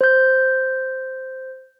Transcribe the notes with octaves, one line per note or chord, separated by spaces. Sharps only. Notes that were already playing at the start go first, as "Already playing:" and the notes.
C5 G6